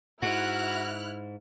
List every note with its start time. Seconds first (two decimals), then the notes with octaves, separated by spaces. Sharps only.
0.22 G#2 E4 F#4 F6 F#6